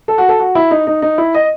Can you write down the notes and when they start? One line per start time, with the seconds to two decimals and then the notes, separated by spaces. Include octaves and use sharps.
0.08 A4
0.18 F#4
0.29 A4
0.40 F#4
0.55 E4
0.71 D#4
0.87 D#4
1.02 D#4
1.18 E4
1.34 D#5